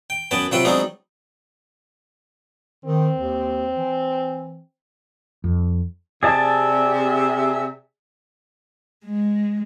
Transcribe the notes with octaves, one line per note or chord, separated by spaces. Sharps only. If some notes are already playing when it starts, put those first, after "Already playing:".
G5
F#2 B3 B4 G5 A5
C3 F#3 F4 B4 E5 G5
F#3 G#3 B3 C4 D4 D#4
D#3 C4
D#2
E3
F2
C3 G#4 D5 E5 A5
G#3